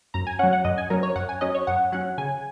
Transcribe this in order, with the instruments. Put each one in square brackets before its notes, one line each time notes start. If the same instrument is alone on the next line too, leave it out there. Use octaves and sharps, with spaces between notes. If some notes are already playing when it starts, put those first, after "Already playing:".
[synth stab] F#2 A#5
G#5
C#4 F#5
F#3
F#5
F#2 D#5
G#5
F#3 C#4 A#4
C#5
F#2 F#5
G#5
F#3 C#4 D#5
C#5
F#2 F#5
F#3 C#4 F#5
C#3 G#5